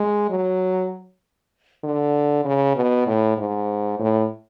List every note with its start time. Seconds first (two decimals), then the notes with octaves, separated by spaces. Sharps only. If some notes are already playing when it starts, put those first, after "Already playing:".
Already playing: G#3
0.30 F#3
1.84 D3
2.45 C#3
2.76 B2
3.06 A2
3.37 G#2
3.99 A2